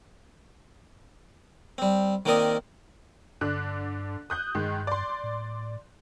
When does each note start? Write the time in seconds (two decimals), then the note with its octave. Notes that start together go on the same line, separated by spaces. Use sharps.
1.78 G3 C4
2.26 D#3 A#3 C4 A#4 D5 D#6
3.41 G2 D3 D4 F#6
4.30 D#6 F#6 G6
4.55 G2 D#3 G#3
4.87 D5 C6
5.24 A2